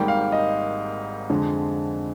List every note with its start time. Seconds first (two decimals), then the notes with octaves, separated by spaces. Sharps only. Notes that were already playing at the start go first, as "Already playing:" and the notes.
Already playing: G#1 G#2 G3 A#3 G5
0.08 F5
0.32 D#5
1.30 F2 D3 G#3